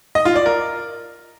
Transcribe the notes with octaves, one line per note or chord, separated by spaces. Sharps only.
D#5
F4
D5
A#4